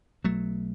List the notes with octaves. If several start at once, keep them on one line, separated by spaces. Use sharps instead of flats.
B1 B2 F#3 A3